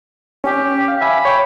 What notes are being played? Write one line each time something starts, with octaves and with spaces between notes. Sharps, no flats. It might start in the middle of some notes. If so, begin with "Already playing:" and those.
C#4 G4
F5
E5 G#5 B5
C#5 G5